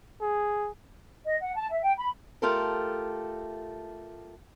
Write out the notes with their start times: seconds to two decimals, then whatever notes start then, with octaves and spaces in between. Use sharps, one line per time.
0.21 G#4
1.25 D#5
1.40 F#5
1.55 A5
1.69 E5
1.82 G5
1.96 B5
2.42 A3 F4 G4 A4 A#4